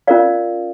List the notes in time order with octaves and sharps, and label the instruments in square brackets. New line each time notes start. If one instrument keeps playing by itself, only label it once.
[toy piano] C#4 F4 A#4 D5 F5